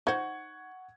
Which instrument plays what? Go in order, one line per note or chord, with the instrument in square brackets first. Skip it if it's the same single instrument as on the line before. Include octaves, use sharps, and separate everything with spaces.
[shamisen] D#4 C5 [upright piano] F#5 C#6 G#6